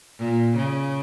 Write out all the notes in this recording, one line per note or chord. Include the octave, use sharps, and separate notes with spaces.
A#2
C#3